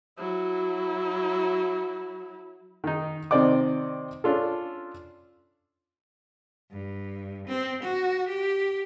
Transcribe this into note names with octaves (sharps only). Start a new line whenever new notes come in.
F#3 E4
D#3 D#4
C3 D#3 C4 D5 D#5 D6
C#4 D4 F4 A4
G2
C4
F#4
G4